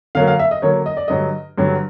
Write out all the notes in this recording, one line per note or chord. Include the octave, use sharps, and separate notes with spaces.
D3 F#3 A#3 F5
F5
E5
D#5
D3 F#3 A#3 C#5
D#5
D5
G2 D3 F#3 D#5
G2 D3 F#3